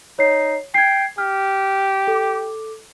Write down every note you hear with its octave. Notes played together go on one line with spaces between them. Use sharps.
D#4 C#5 C7
G5 G#6 C7
G4 F6
A4 D6